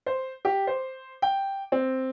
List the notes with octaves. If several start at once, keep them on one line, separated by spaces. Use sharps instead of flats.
C5
G4
C5
G5
C4